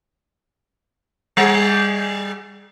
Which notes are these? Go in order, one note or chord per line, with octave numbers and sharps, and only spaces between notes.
G3 G#4